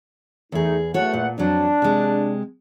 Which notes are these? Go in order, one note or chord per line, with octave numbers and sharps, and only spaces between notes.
E2 A3 D#4 G#4
E2 A3 F#4 A4 C#5 F#5
A#2
F2 F#3 D4
C3 G#3